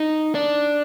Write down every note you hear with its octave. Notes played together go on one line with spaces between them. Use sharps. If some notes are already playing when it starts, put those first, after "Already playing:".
Already playing: D#4
D4